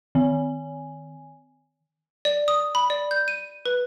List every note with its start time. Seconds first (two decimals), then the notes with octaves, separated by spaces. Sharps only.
0.15 D#3 G#5
2.25 D5
2.48 D#6
2.75 B5
2.90 D5
3.11 G6
3.28 D#7
3.66 B4